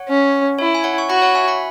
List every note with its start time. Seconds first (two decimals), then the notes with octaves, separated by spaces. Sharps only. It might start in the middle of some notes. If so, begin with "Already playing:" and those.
Already playing: C#5 F#5
0.08 C#4
0.59 E4 C#5
0.75 G#5
0.84 C#5 F#5
0.98 C#6
1.09 F#4 F#5 B5
1.22 C#5 F#5
1.35 E5 G#5
1.48 F#5 B5